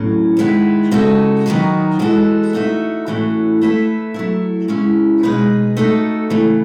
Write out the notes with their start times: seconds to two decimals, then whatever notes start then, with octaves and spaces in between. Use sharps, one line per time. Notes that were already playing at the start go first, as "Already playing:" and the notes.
Already playing: A2 F#3 C#4
0.37 D#3 G#3 B3 E4 B4
0.91 C#3 G#3 D#4 F#4 A4
1.46 D#3 F#3 B3 D#4 F#4
1.99 E3 G#3 B3 F#4 A4
2.53 A3 D#4 F#4 C#5 E5
3.06 A2 E3 A3 C#4 F#4
3.61 A3 E4 B4 E5
4.14 F#3 A3 E4
4.68 C#3 G#3 C#4 E4
5.23 B2 G#3 D#4 G#4 B4
5.77 A3 D#4 F#4 A4
6.30 C#3 E3 A3